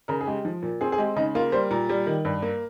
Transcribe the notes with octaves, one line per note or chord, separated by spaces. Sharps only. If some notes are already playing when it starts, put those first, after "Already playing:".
C#3 A#4
G#4
G#3 G4
F3
A#2
C4 G#4
G#4
G#3 G4
C#3 D#4
A#3 F4
G3 C5
A#2 A#4
G3
D#3
G2
A#3